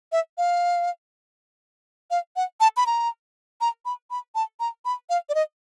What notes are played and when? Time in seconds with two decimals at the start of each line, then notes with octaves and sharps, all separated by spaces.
0.12 E5
0.38 F5
2.11 F5
2.36 F#5
2.60 A5
2.77 B5
2.86 A#5
3.61 A#5
3.85 B5
4.11 B5
4.35 A5
4.60 A#5
4.85 B5
5.10 F5
5.29 D5
5.35 D#5